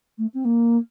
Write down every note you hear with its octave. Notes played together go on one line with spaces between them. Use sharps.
A3
C4
A#3